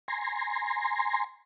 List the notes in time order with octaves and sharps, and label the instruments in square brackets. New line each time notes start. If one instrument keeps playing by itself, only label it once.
[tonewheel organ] G#5 A#5 C6